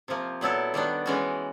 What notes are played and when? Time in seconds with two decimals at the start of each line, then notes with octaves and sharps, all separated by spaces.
0.08 C3 F3 A#3
0.41 A#2 F#3 B3 E4 A4
0.74 D#3 G3 B3 D4
1.06 E3 G#3 C#4 F#4